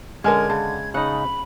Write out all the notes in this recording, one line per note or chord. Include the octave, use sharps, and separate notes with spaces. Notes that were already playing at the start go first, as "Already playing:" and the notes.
D3 G#3 C#4 A#4 G#5 F6 G#6
C#3 A5
C#3 D#4 F#5 B5